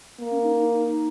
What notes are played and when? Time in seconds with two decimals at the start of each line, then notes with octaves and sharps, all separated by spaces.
0.20 A#3
0.31 C#4
0.43 D#4
0.61 D#4
0.78 D#4